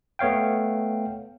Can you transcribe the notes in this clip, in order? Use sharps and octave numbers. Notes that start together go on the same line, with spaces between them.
A3 B3 C#5 F5 G5